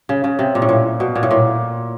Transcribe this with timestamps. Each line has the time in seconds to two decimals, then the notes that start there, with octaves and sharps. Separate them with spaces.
0.09 C#3
0.24 C#3
0.39 C3
0.55 A#2
0.62 A2
0.69 A#2
1.00 B2
1.16 A#2
1.23 A2
1.31 A#2